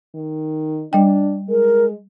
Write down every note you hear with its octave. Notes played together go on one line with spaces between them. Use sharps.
D#3
G3 D4 G5
G#3 A#4